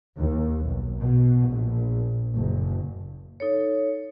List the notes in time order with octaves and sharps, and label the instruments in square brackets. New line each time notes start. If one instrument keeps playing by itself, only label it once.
[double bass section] D#2
B1
B2
A#1
F#1
[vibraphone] D#4 A4 C#5